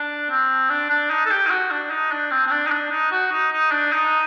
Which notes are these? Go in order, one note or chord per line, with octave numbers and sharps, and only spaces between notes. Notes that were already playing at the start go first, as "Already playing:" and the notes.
Already playing: D4
C4
D4
D4
D#4
A4
G4
D#4
F#4
D4
D#4
D4
C4
C4
D4
D#4
D4
D#4
F#4
D#4
D#4
D4
D#4